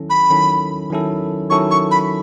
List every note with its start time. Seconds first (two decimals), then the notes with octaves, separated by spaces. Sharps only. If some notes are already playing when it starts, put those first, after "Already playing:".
Already playing: D#3 F#3 C#4 E4 A4
0.10 B5
0.30 D#3 F#3 C#4 E4 A4
0.90 D#3 F#3 C#4 E4 A4
1.50 D#3 F#3 C#4 E4 A4 C#6
1.71 C#6
1.91 B5